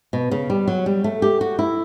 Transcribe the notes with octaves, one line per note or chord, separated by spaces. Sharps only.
B2
C#3
G3
F#3
G3
A3
G4
F#4
E4